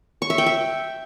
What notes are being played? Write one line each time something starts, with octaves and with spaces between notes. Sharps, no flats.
C#6
E5
G5
E5